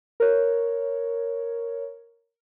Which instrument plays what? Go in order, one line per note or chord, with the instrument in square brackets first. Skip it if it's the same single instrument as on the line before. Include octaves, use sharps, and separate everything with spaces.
[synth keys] A#4 C#5